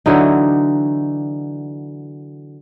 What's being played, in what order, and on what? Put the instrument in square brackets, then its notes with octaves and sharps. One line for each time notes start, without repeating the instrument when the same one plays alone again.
[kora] D3 E3 F#3 D#4